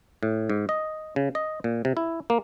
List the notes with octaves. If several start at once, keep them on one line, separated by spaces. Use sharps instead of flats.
A2
G#2
D#5
C#3
D#5
A#2
C3
E4
A#3